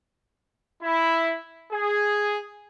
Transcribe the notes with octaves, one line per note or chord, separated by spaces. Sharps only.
E4
G#4